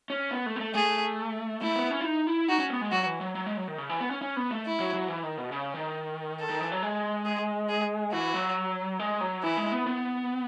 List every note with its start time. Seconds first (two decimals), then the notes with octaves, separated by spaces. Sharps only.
0.10 C#4
0.31 B3
0.46 A3
0.56 B3
0.60 A3
0.75 A3 G#4
1.62 A3 E4
1.76 B3
1.91 C#4
2.01 E4
2.05 D#4
2.27 E4
2.48 D#4 F#4
2.59 C#4
2.70 B3
2.81 G#3
2.92 F#3 F#4
3.06 E3
3.21 F#3
3.35 F#3
3.46 G#3
3.57 F#3
3.68 D#3
3.78 C#3
3.90 E3
4.00 B3
4.11 C#4
4.22 C#4
4.37 B3
4.51 A3
4.66 E4
4.80 F#3
4.94 F#3
5.08 E3
5.23 D#3
5.38 B2
5.52 C#3
5.74 D#3
6.40 A4
6.50 D#3
6.61 E3
6.72 F#3
6.83 G#3
7.26 G#4
7.69 G#4
8.12 E3 F#4
8.34 F#3
9.00 G#3
9.21 F#3
9.43 E3 E4
9.57 G#3
9.72 B3
9.87 B3